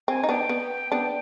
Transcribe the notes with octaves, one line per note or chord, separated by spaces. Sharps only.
C4 G#5
D#4
B3 D4 G5
B3
B3 D4